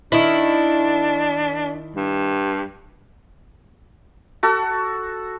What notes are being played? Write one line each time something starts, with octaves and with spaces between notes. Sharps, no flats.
D#3 D4 E4
G2
F#4 A4